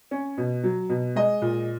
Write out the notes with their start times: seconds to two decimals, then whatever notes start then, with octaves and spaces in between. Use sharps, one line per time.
0.11 C#4
0.37 B2
0.64 F#3
0.89 B2
1.15 G#3 D#5
1.42 A#2